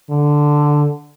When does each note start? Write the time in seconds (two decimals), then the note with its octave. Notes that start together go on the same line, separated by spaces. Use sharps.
0.10 D3